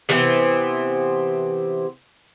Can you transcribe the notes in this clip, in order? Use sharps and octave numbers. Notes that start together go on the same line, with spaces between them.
C3 E3 B3 C4